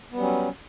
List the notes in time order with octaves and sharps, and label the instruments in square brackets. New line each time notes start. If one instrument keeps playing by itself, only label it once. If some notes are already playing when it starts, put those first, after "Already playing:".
[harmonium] B3
G3
F#3
C#4